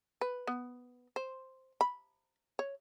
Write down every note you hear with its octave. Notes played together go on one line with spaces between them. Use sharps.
B4
B3
C5
B5
C#5